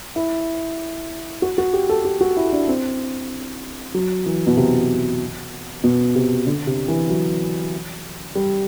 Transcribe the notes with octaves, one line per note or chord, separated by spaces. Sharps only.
E4
F#4
F#4
G4
A4
G4
F#4
E4
D4
C4
F#3
E3
B2
C3
B2
C3
D3
C3
E3
F#3
G3